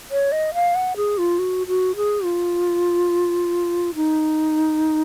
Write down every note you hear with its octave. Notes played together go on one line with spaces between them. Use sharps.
C#5
D#5
F5
F#5
G#4
F4
F#4
F#4
G#4
F4
D#4